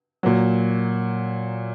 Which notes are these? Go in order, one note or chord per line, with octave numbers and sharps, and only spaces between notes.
A#2 F#3